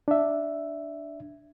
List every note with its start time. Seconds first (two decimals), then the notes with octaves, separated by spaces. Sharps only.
0.08 D4 E5